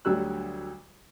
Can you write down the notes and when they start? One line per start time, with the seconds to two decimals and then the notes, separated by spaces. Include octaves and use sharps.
0.05 D2 D3 F#3 G3 E6 F#6